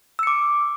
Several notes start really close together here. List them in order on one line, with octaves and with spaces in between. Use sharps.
E6 C#7 D6